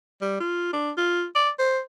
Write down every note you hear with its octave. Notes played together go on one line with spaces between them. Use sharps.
G3
F4
D4
F4
D5
C5